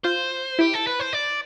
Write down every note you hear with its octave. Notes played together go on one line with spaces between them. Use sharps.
F4 C5
E4 G4
A4
B4
C5
D5